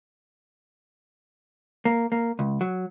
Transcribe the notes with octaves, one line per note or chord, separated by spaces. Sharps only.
A#3
A#3
C#2
F#3